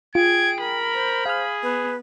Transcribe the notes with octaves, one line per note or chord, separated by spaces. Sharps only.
F4 G#4 G5 G#6 D7
A#4 B5
C5
G#4 F5 F6
B3 B4